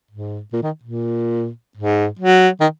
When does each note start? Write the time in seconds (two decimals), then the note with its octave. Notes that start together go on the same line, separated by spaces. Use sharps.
0.11 G#2
0.52 A#2
0.63 D#3
0.83 A#2
1.77 G#2
2.19 F#3
2.60 D#3